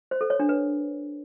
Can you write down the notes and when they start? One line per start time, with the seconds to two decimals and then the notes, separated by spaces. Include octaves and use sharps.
0.11 C5
0.21 A4
0.30 C#5
0.40 D4
0.49 B4